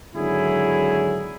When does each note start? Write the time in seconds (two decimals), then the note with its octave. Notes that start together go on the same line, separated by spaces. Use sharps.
0.15 G#1 D3 F#3 E4 G#4